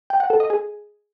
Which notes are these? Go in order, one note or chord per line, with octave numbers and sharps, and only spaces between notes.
G5
F#5
A4
D#5
G#4